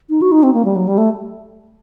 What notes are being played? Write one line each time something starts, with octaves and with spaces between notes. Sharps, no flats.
D#4
F#4
D#4
C4
A#3
G3
F#3
G3
A3